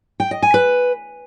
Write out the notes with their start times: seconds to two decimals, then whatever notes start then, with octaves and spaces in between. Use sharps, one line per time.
0.20 G5
0.31 D#5
0.43 G#5
0.54 B4